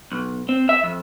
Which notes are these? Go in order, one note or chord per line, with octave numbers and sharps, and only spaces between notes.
B1
C4
E5
F2